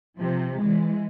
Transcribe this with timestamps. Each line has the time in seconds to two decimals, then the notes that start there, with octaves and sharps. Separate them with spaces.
0.17 C3 F3
0.58 E3 G#3